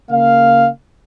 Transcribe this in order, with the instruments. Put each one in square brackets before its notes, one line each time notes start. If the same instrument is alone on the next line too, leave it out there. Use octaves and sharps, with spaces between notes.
[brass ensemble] C#3 A#3 F5